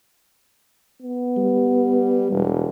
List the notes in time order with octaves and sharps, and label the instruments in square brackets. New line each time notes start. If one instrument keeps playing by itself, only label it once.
[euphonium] B3
[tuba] G3
E1